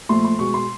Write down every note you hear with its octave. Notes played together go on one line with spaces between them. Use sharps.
A#2 F3 A3 C6
C6
B2 G#3 C#6
C6